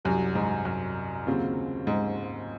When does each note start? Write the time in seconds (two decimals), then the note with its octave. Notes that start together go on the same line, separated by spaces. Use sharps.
0.05 C2 F#2 C3 F#3
0.35 G#2
0.65 F#2
1.26 D#2 C#3 F#3 C4 F4
1.87 G#2